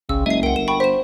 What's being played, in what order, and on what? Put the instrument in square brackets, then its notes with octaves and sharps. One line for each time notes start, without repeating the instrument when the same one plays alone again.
[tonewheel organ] G1 C2 [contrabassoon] C#3 [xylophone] E6
[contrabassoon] F#1 [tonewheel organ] G#3 D#5 [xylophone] E5 C7
[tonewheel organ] C2 A#4 G5 [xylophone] F#5 D7
[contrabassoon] G1 [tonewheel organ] A#4 [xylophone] E7
[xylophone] G5 B5 C#6
[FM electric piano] C5 [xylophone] B6 E7